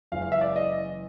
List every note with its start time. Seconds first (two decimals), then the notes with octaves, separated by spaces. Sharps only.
0.12 F#1 E2 C#3 E3 G#3 F5
0.22 F5
0.32 E5
0.41 D5
0.56 D#5